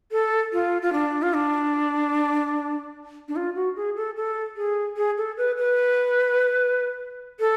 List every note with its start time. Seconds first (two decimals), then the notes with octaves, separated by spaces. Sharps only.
0.12 A4
0.53 F4
0.82 F4
0.93 D4
1.22 F4
1.34 D4
3.28 D4
3.36 F4
3.55 F#4
3.76 G#4
3.96 A4
4.16 A4
4.57 G#4
4.97 G#4
5.18 A4
5.37 B4
5.57 B4
7.40 A4